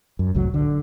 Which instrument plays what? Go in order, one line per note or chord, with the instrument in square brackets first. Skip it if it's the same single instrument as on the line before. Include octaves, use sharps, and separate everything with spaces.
[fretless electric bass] F#2
F#1 C2 A2 F#3
D3